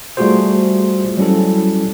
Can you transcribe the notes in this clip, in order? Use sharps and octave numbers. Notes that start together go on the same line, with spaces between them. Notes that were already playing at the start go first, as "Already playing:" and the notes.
G3 A3 F4 F#4 G#4 C5
F#3 G3 C#4 E4 A4